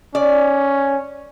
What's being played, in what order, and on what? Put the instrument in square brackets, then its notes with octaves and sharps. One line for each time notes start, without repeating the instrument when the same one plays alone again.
[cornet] C#4 [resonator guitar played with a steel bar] D5